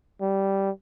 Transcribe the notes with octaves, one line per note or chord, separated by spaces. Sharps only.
G3